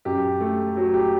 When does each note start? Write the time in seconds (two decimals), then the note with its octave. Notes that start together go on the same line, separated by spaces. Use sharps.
0.05 F#2 G4
0.40 A3
0.77 F#3
0.94 G4